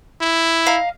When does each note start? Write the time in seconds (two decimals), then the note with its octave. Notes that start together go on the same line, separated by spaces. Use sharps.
0.21 E4
0.66 D#5 F5 A#5